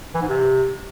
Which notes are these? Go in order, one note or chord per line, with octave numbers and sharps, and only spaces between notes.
E3
G#2
C3